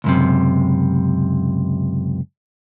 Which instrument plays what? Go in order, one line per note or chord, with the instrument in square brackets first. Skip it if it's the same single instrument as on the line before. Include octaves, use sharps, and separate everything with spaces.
[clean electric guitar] C#2 F#2 C3